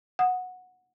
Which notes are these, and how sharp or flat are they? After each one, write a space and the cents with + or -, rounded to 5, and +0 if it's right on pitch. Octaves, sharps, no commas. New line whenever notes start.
F#5 -15 D#6 +0